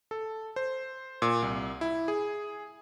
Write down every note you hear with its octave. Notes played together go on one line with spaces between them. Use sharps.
A4
C5
A#2
C2
E4
G#4